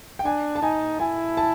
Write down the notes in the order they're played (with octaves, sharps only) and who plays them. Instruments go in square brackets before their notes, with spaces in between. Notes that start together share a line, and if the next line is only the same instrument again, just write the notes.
[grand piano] G5
[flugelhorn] D4 [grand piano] G#5
[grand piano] A5
[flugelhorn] D#4 [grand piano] G#5
[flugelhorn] E4 [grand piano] G#5
[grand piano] A5